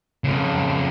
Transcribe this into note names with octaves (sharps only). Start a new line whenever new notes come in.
F2 C#3